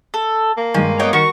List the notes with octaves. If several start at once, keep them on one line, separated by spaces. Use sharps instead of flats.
A4
A#3
G2 D#3 G#3 G#5
B3 C#5 D#5 G5
D#3 F#4 A#4 C#6